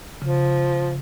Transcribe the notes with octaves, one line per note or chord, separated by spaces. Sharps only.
C#3 F3